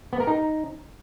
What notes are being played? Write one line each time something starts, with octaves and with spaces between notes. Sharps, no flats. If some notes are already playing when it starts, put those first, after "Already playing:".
B3
A#4
D#4